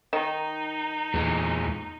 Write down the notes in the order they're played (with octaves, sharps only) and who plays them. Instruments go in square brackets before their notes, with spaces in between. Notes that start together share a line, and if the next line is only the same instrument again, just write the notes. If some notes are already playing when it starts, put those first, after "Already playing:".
[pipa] D#3 [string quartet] D#4
[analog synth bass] E2 [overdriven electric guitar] A#2 G#3